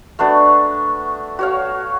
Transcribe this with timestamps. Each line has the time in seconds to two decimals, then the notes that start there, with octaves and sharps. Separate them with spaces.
0.19 A3 B3 D4 F#4
1.39 F#4 C#5 F5